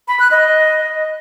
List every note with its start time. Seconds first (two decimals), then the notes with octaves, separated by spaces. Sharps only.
0.08 B5
0.20 F#6
0.31 D#5